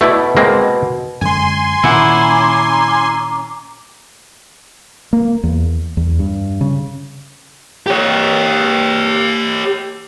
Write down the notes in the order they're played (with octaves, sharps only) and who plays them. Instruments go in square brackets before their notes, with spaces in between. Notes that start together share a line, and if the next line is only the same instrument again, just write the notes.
[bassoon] B2 [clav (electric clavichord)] A3 E4 D5
[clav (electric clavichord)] G#3 A#3 C4
[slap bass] F#2 D3 G#3 [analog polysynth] G#5 C6
[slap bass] A#2 D#3 [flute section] C#4 A#5 D6 [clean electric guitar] E4 F#5
[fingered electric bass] A#3
E2
E2
G2
C#3
[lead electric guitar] G4 C#5